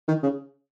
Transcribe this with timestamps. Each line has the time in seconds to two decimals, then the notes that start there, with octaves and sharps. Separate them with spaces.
0.08 D#3
0.23 C#3